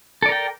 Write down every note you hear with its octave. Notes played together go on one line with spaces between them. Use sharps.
A4 A#4 D5 G5